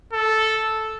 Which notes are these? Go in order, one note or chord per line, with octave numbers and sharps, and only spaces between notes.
A4